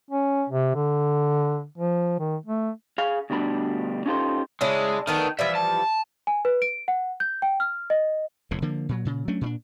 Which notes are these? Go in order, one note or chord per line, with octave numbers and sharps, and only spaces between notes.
C#4
C3
D3
F3
D#3
A3
G#4 F5
D2 B2 G3 D4 B5
C#4 D#4 F4 G4 A4 C5
C#3 G#3 D4 E4
D#3 A3 B3 D4
E3 F3 G3 E5
A5
G#5
B4
D7
F#5
G6
G5
F6
D#5
F1 E2 A2
D3 F3 A#3
A#2 F#3
A#2 C#3
F#3 A3 C#4 D4
A#2 C#4 D4